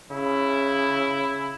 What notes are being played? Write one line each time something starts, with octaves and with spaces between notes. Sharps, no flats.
C#3 E4